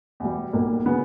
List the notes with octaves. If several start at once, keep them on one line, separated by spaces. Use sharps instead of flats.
E2 B2 G3
B1 A#2 G3 A#3
C#3 F#3 B3